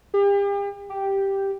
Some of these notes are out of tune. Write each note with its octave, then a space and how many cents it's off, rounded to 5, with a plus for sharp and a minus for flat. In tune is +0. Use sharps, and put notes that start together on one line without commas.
G4 +40
G4 +0